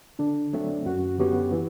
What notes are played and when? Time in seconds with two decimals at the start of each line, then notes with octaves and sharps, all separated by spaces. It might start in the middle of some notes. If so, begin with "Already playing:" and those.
0.19 D3 D4
0.53 F#3 A3 C4
0.86 F#2 F#4
1.19 D3 F#3 B3 F#4 G4
1.52 E3